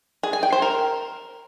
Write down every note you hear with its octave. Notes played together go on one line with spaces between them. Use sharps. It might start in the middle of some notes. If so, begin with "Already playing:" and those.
G#4
G#5
G5
C5
A#4